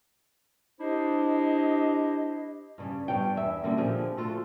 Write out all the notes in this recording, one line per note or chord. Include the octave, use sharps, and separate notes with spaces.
D4 E4 G4 C5 D#5
G2 C#3 G3
G2 G3 B3 C#5 G5
E2 E5
D3 F#3 G3 A#3 C#4
A#2 D3 F3 C4 G4 G#4
A3 F4 F#4 A4